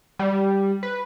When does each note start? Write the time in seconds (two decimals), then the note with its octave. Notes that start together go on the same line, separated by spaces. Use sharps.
0.19 G3
0.83 B4